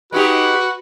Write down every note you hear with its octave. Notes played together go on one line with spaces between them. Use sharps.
G#3 D#4 F#4 G4 B4